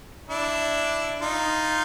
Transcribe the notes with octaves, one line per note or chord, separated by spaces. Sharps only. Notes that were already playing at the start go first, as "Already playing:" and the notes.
D4 E4
D#4 F4